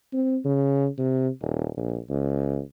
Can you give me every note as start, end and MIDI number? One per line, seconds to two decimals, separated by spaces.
0.13 0.38 60
0.45 0.87 49
0.98 1.29 48
1.41 1.68 27
1.77 1.98 34
2.09 2.60 37